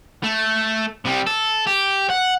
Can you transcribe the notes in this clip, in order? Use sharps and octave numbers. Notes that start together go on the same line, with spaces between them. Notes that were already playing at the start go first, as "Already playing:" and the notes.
A3
C3 G3
A4
G4
F#5